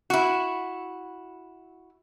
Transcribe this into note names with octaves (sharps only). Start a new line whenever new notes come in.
E4 F#4